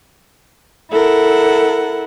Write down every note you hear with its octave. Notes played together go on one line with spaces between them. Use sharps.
E4 A4 A#4 F#5